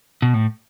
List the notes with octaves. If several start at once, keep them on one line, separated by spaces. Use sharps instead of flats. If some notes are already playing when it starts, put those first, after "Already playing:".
B2
A2